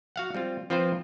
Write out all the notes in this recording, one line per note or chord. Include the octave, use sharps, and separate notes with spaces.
F#4 F5 F#5
G3 C4 F4
F3 C4 F4 B4 C5